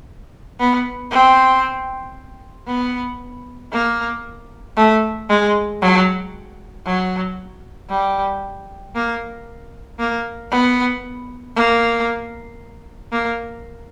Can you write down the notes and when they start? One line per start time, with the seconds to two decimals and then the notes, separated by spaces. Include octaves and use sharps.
0.60 B3
1.11 C4
2.68 B3
3.72 A#3
4.77 A3
5.29 G#3
5.82 F#3
6.86 F#3
7.90 G3
8.95 A#3
9.99 A#3
10.51 B3
11.56 A#3
13.12 A#3